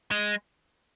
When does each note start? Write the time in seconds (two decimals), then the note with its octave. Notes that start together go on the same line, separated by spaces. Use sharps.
0.11 G#3